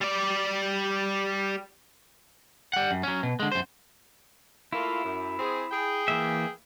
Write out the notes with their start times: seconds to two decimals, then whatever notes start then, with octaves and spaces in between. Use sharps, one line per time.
0.01 G3 D5
2.73 G3 F#5
2.91 F#2
3.03 F#3 C#4
3.23 B2
3.40 D3 G#3
3.52 F#2 C5
4.73 A3 A#3 E4 F4
5.05 F#2
5.39 C4 G#4
5.71 G#4 G5
6.08 E3 A#3 E5